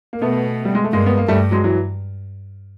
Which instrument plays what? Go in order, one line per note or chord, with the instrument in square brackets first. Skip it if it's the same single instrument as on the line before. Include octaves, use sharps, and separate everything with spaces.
[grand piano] A#3
[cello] B2 [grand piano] A3 B3
[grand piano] G3
G#3
A3
[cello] G2 [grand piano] G#3 A#3
[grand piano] B3
A#3
[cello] G2 [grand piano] G3 A3
[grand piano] F#3 G#3
E3 F#3